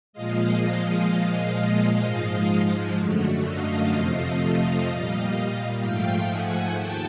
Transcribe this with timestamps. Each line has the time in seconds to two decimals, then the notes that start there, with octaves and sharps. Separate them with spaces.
0.13 A#2 F3 G#3 D#5 F5
1.08 A#2 F3 G#3
2.03 G#2 F3 G#3
2.97 F#2 D3 F#3 A3
3.44 D#5 F5
3.91 F2 C3 F3 A3 D#5 F5
4.87 A#2 G3
5.81 G#2 F3 A3 F5 G5
6.28 F#5 G#5
6.76 D#2 G5 A5